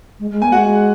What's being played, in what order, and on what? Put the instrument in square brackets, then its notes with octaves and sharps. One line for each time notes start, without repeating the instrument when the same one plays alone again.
[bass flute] G#3
G#3
[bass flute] B3 [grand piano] G#5
[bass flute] G#3 [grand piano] F#4 F#5